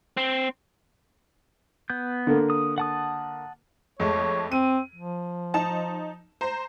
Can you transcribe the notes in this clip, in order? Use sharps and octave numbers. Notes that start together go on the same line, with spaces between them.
C4
B3 G6
D3 A#3
D#6
F#5 A5 D#6
F2 G#3 A3 C#5
C4 D#7
F3
D#4 A5
C5 A#5